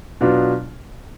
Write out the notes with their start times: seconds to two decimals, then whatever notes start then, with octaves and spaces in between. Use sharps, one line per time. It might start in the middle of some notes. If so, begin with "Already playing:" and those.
0.21 B2 F#3 B3 D4 F4